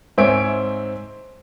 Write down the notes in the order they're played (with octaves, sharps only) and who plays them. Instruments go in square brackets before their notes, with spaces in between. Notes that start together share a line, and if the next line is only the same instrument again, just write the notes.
[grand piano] G#2 C4 C#5 E5 G#5 D7